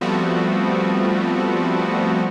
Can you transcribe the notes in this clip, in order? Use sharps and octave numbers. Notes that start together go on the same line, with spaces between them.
F3 G3 A3 B3 C4 F#4